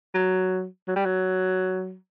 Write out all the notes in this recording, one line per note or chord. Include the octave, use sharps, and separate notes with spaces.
F#3
F#3
G3
F#3